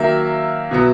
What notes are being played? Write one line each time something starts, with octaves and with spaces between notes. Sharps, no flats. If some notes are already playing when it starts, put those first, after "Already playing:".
Already playing: D#3 F#3 A#3 E5
B2 F#3 B3